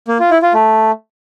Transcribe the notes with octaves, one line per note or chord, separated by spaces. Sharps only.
A#3
F4
E4
F4
A3